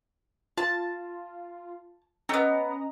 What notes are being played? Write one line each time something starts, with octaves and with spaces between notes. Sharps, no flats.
F4 A5
A3 B3 C#4 D#5 A#5